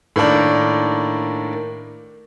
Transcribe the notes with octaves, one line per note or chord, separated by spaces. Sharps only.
A2 D#3 A#3 D4